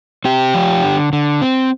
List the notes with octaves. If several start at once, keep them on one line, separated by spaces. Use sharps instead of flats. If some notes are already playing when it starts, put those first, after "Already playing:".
C4 G4
F3
D3
D3
C4